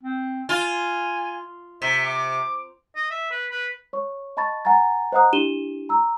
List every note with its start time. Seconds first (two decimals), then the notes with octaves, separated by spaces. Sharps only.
0.03 C4
0.49 F4 G#5
1.82 C3 E5
2.06 D6
2.96 D#5
3.11 E5
3.31 B4
3.51 B4
3.93 C#5 C#6
4.37 D#5 A5 B5 C#6 A6
4.65 F#5 G#5 A#5 A6
5.12 C5 D#5 F#5 A#5 D#6 F#6
5.32 D4 E4 G4 D#7 E7 G7
5.89 A#5 E6